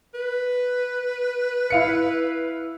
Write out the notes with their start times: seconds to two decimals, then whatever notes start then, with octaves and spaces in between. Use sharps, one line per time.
0.14 B4
1.70 E4 F5 C#7